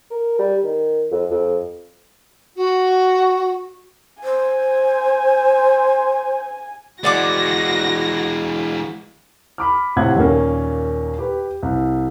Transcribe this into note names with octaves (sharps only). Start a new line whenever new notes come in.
A#4
G3
D#3
F2
F2
F#4
C5 G#5
E3 G#3 F#4 D5 F#5 D6 A#6
B5 D6 F6
A2 C3 F4 F#5 G#6
D#2 A#2 A#3 C#4
G4 B4
C2